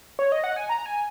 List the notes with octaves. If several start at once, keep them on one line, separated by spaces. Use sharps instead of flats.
C#5
D#5
F#5
G#5
A#5
G#5